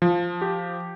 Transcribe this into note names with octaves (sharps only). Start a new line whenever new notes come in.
F3
G4